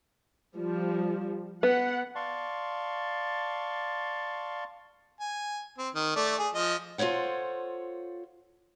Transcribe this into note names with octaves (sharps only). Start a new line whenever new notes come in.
F3 G3
B3 F#5
D5 F5 A5 C6 C#6
G#5
C4
D#3
A3 D5
G#4
F3 D#5
F4 A4 C5 C#5 F#5